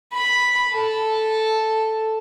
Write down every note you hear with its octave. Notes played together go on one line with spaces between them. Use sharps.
B5
A4